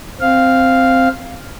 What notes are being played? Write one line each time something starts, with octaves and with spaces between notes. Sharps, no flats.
C4 F5